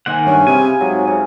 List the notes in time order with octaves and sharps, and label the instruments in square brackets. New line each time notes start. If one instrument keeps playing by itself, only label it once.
[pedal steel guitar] D#3 A#3 F#5 [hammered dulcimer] C5 E5 G#5
[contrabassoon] G2 [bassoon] C#4
[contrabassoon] C3 [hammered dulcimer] E4 G#4 F5 [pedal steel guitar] G#5
[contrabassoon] G#2 [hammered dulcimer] C3 [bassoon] F#3
[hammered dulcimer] C#3 [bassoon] F#3